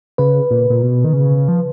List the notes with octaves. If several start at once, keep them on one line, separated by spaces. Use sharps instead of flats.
C#3 B4
A#2
A#2
B2
D#3
C#3
F3